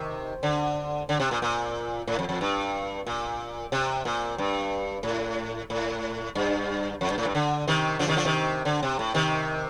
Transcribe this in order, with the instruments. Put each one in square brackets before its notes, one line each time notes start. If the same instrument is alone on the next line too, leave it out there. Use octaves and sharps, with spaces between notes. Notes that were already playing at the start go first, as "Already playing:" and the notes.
Already playing: [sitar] C3 D#3
D3
D3
C3
A#2
A#2
A2
F2
F2
G2
A#2
C3
A#2
G2
A2
A2
G2
F2
G2
A2
G2
D3
C3 D#3
D3 F3
C3 D#3
D3 F3
C3 D#3
D3
C3
A2
C3 D#3